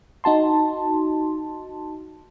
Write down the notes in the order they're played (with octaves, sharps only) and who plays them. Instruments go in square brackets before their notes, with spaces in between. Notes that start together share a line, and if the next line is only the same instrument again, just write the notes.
[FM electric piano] D#4 F#4 A5 C6